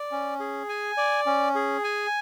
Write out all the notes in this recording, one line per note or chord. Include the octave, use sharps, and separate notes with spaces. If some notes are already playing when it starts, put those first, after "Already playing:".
Already playing: D5
C#4
G#4
G#5
D5
C#4
G#4
G#5